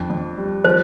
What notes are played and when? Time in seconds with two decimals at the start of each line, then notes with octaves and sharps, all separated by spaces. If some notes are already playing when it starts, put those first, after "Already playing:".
Already playing: F2 D4
0.10 F2
0.37 G3
0.64 F3 C5